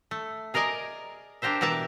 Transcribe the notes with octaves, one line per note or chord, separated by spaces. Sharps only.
A3
G#4 A#4 D5 D#5 G#5 A#5
D4 G4 A#4 C5 E5
B2 E3 A#4 E5 A5